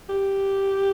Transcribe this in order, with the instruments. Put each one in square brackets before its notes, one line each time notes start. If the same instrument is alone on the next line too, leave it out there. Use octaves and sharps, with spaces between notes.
[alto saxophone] G4